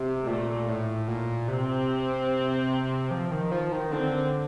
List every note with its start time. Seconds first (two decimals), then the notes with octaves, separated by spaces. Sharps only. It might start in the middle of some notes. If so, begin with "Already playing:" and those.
Already playing: C3
0.27 A#2 A3
0.68 A2
1.08 A#2
1.48 C3 C4
3.11 F3
3.31 D#3
3.51 F3
3.72 D#3
3.92 D3 C4